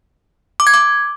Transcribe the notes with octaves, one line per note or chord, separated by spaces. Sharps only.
D6
G#6
D6